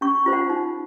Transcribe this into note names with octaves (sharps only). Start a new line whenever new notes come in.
C#4 C#6
F4 C5
F#5
D#4